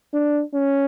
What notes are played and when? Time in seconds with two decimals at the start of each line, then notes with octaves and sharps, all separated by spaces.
0.13 D4
0.54 C#4